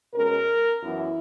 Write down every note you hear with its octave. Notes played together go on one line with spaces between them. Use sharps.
B2 G#3 C#4 A#4
F#2 E3 B3 E4